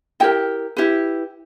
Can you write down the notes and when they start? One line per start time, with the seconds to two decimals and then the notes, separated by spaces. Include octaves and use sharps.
0.20 E4 G4 A#4 D#5 G5
0.77 E4 G4 B4